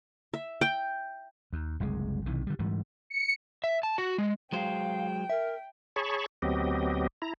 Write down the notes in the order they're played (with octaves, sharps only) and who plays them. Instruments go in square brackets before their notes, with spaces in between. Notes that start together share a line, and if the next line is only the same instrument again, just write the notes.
[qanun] E5
G5
[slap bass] D#2
F#1 C2 B2 G#3
B1 C3 D#3 E3
D3 G3
G#2 E3 G3
[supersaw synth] C#7
[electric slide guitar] E5
A5
F#4
G#3
[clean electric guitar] F#3 G#3 C5 [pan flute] F5 [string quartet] G5
[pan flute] A#4 [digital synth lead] E5
[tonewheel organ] G#4 C#5 A5 B5 C#6
D2 F#3 B3 C4 G4 D#5
E4 A#5